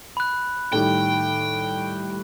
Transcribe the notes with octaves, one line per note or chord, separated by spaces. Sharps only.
B5 F#6
A2 D#3 G3 G5